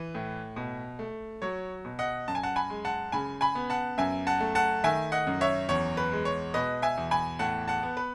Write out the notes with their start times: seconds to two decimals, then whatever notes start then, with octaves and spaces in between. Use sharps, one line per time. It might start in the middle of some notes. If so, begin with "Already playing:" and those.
Already playing: E3
0.15 A2
0.56 B2
0.99 A3
1.42 F#3 C#5
1.85 B2
1.99 D#5 F#5
2.28 F#2 A5
2.35 G#5
2.43 F#5 A5
2.56 G#5 B5
2.70 G#3
2.85 F#5 A5
3.12 C#3 G#5 B5
3.41 G#5 B5
3.55 B3
3.70 F#5 A5
3.98 F#2 E5 G#5
4.27 F#5 A5
4.40 A3
4.55 F#5 A5
4.84 D#3 E5 G#5
5.12 D#5 F#5
5.27 F#2
5.41 C#5 E5
5.69 E2 C#5
5.97 B4
6.12 G#3
6.25 C#5
6.54 B2 B4 D#5
6.82 E5 G#5
6.97 E2
7.11 G#5 B5
7.39 A2 F#5 A5
7.68 F#5 A5
7.83 B3
7.97 B4